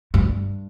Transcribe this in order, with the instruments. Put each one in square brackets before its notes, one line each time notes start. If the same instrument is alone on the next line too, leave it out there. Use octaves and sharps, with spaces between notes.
[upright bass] G2